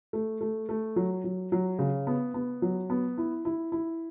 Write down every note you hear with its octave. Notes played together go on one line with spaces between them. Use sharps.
A3
A3
A3
F#3
F#3
F#3
C#3
B3
B3
F#3
B3
E4
E4
E4